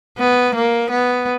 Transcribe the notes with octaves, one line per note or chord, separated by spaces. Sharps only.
B3
A#3
B3